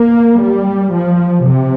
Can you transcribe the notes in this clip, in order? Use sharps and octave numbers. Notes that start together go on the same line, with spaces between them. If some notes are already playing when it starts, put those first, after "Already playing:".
Already playing: A#3
G3
F3
C3